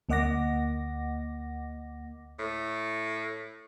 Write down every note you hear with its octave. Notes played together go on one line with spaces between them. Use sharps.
D2 A#3 D#5 F#5 D6 A#6
A2